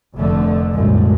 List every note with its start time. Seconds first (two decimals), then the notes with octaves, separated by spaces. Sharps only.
0.16 F1 F2 D3 A3
0.73 C2 F#2 A#2 G#3 A3